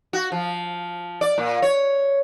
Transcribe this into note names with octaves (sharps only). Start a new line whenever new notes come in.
F#4
F3
D5
A#2
C#5